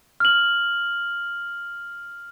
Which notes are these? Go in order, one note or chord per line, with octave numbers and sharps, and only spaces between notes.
F6 F#7